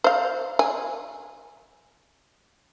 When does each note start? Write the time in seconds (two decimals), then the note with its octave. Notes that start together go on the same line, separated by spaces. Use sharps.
0.04 C5 F5
0.59 G#5